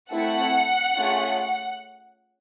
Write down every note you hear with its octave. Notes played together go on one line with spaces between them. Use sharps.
A3 C4 E4 A4 F#5
A3 C#4 F4 G#4